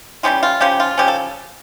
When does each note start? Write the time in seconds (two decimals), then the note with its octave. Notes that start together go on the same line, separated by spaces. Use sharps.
0.23 E3 G3 C#4 F4 G4
0.43 F4
0.60 C#3 F3 C#4 G4
0.80 F4
0.98 C#3 F3 C#4 G4
1.08 A4